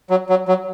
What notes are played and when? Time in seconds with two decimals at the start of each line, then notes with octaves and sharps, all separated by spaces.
0.10 F#3
0.29 F#3
0.48 F#3